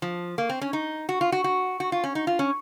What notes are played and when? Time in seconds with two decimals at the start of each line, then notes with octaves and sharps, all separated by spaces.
0.02 F3
0.38 A#3
0.49 C4
0.61 C#4
0.73 D#4
1.09 F#4
1.21 F4
1.32 F#4
1.44 F#4
1.80 F#4
1.92 F4
2.04 C#4
2.15 D#4
2.27 F4
2.39 C#4